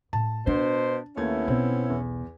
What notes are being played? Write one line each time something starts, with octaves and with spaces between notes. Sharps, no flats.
A2 A5
B2 D4 C5
D#2 A3 B3 C#4 E4 G#6
B1 C4
E2